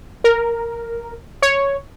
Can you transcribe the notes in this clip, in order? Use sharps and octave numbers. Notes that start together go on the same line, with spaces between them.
A#4
C#5